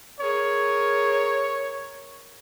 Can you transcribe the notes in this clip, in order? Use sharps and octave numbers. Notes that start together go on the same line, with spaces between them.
G#4 A#4 C#5